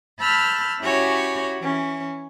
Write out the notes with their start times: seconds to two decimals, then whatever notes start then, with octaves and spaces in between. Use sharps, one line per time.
0.20 A5 B5 E6 F6 G6
0.80 C#4 E4 F#4 G4 C#5 G#5
1.60 E3 C#4